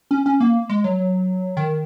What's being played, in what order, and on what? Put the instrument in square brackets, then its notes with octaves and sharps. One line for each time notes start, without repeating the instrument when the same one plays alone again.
[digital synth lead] C#4
C#4
A#3
G#3
F#3
D#3